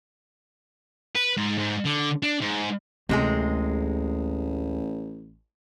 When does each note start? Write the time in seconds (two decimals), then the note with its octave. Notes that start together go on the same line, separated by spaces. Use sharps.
1.15 B4
1.37 G#2
1.58 G#2
1.86 D3
2.23 D4
2.41 G#2
3.09 A1 D2 C3 G#3 G#4